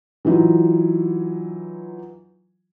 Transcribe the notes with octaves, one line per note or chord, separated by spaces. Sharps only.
E3 F#3 D#4 F4